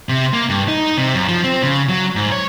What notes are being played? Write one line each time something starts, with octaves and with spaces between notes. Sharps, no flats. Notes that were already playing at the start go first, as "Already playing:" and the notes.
C3
A#3
G2
D#4
C3
F#2
F3
C4
C#3
F#3
G#2
C#5